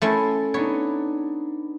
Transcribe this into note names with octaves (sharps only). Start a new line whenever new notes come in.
A3 C#4 E4 C6 A6
B3 D4 D#4 C#5